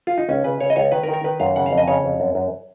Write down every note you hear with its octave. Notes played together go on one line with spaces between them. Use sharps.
F4
D#4
C#2 C#4
C#3 B4
C#3 C#5
D#5
C#2 C#5
D#3 B4
A#4
D#3
A#4
D#3 B4
F#2 F5
C#3 F#5
F5
F2
D#5
C#3 C#5
F2
F#2
F#2